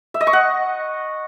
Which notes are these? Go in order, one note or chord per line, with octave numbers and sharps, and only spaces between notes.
E5
D#5
C#6
F#5